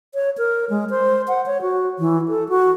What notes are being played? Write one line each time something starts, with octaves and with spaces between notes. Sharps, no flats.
C#5
A#4
G#3
C5
F#5
C#5
F#4
E3
A4
F#4